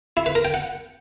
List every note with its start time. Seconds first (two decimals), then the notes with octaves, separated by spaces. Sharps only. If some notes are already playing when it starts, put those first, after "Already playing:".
0.17 E4
0.26 B4
0.35 A#4
0.45 G5
0.54 F#5